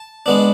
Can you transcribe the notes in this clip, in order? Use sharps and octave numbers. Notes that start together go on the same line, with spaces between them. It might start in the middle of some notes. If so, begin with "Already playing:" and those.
Already playing: A5
G#3 B3 D4